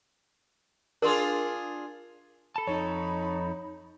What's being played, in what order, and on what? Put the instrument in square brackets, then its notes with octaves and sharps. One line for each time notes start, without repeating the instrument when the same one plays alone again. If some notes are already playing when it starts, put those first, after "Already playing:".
[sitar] D4 F4 G#4 [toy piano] A#4 C6
[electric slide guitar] A4 A5 [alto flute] B5
[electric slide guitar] F2 A4 [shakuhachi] D#4 [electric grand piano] C#5